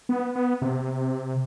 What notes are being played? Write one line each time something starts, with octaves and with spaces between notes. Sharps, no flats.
B3
B3
C3